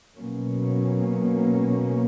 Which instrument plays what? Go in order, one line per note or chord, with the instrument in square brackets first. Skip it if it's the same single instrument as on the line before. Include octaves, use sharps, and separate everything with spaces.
[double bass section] B2 F#3 A#3 C#4